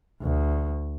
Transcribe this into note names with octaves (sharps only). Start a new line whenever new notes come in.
D2